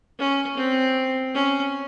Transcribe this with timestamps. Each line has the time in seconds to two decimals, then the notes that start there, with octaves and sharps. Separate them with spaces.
0.19 C#4
0.57 C4
1.35 C#4